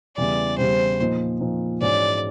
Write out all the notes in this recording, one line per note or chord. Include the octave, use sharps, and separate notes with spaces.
E2 C#3 E3 G3 D5
E2 C#3 E3 G3 C5
A#2 F3 A#3 D#4
A#2 F3 A#3 D#4
G#2 E3 G#3 C#4 F#4 D5